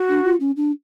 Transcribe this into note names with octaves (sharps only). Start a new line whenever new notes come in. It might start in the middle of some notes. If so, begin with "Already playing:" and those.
Already playing: F#4
D4
F4
C#4
D4